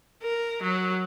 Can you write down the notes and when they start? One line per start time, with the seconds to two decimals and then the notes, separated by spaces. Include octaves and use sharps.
0.22 A#4
0.62 F#3